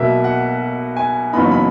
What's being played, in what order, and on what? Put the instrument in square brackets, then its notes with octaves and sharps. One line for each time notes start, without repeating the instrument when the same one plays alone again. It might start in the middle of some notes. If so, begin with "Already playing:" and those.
Already playing: [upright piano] B1 B2 A#3 E5
F#5
G#5
F#1 F#2 E3 B3 D#4 B5
C#6
B5